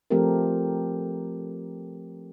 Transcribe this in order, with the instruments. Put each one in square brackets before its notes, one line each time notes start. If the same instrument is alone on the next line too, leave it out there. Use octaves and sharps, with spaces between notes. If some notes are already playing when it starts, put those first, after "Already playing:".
[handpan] F3 A3 C4 G4 A4 A#4